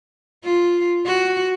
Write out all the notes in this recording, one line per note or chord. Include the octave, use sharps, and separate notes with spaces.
F4
F#4